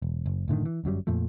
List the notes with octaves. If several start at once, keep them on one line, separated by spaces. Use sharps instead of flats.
E1
F#1
F#1 A2 D3 D#3
E3
G1 F#2 F#3 G3
F2 A#2 F3 A3